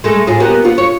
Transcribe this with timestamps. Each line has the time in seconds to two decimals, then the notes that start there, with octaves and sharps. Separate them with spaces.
0.04 G#3 A3 A4
0.27 A2 F4 G#4
0.40 A#3 B3 G4
0.65 B3 F4
0.78 C#5